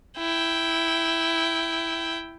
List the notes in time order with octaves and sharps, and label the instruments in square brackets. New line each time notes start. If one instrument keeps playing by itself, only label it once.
[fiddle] E4 G5